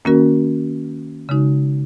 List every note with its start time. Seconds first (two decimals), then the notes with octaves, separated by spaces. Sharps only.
0.05 D#3 A#3 C#4 F#4 A#4
1.29 C#3 G#3 D#4 F#4